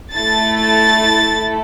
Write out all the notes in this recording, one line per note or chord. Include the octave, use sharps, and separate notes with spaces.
A3 E4 A4 A6
A6